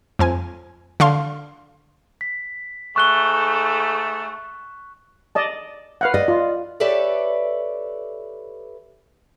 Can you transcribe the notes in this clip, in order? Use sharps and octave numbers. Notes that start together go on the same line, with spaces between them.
F2 F3 G#5
D3 F5 C6
B6
G#2 A3 C#6 F#6 G7
D5 D#5 A5
B4 F5 F#5
D5 D#5
F4
G4 A4 B4 C#5 D5 E5